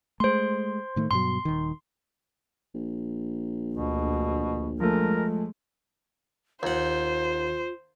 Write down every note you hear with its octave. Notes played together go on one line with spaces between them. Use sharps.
G#3 A3 C5 C6
A2 D#3 A3
G2 B2 F#3 C6
D#1 D#3
A#1
D2 B2
F3 G#3 A3 A#4
D#2 F4 C5 F#5